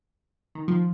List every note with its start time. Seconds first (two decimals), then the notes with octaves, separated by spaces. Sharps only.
0.55 D#3
0.68 F3